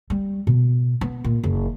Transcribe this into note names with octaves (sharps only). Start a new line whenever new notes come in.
G3
B2
B3
A#2
F#1